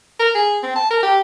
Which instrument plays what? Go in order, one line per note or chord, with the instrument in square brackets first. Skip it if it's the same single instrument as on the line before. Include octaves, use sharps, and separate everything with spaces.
[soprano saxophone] A#4
G#4
C4
A5
A#4
G4